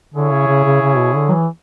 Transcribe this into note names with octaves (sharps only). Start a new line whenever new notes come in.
D3 E4 G#4 C#5
C#3
C#3
C#3
C#3
B2
D3
F#3
E3